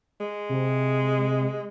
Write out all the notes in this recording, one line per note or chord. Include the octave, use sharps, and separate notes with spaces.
G#3
C3